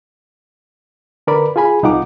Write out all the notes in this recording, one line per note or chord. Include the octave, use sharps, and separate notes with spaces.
D3 A#4 B4 D5 B5
F4 G#4 G#5 B5
C2 D#4 F4 F#5 D6